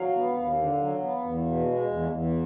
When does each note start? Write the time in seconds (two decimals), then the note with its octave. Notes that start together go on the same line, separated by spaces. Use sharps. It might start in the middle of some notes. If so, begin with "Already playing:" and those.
Already playing: F#3 F5
0.16 B3
0.37 D#2
0.59 D3
0.81 F#3
1.02 B3
1.24 E2
1.46 B2
1.67 G#3
1.89 E2
2.11 E2